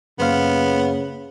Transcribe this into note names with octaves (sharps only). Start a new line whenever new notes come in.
F#2 C#3 A#3 B3 C5 F5